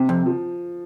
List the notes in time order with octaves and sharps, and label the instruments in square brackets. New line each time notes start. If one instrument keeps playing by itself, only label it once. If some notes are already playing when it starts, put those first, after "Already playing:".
Already playing: [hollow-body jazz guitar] C3
F2
[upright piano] F3